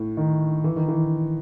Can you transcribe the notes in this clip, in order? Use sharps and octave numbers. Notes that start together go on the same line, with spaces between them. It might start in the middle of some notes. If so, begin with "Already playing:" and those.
Already playing: A2
D#3
E3
D#3
E3